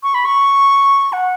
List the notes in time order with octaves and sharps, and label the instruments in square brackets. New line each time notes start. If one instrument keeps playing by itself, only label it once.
[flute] C#6
B5
C#6
F#5